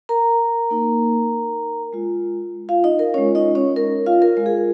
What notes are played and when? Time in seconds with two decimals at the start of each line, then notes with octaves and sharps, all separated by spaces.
0.09 A#4 A#5
0.70 A#3 D#4
1.93 G#3 F4
2.69 F4 F5
2.84 D#4 D#5
2.99 A#4
3.14 G#3 C#4 F4 C#5
3.35 D#4 D#5
3.55 C#4 C#5
3.76 A#4
4.06 F4 F5
4.22 A#4
4.37 G#3 F4 A#4
4.46 G#4